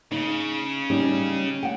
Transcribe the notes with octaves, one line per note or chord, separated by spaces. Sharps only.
C#3 D#4
G3 C#4 D#4
F#5 G5